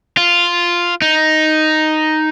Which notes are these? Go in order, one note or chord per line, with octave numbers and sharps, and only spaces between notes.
F4
D#4